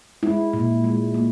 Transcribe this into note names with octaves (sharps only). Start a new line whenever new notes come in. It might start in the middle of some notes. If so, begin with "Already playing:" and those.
G#3 E4
A#2
G#3
A#3